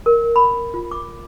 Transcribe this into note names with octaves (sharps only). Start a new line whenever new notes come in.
A#4
B5
F4
D6